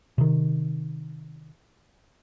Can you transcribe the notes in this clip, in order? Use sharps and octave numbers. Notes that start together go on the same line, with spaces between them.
C3 D#3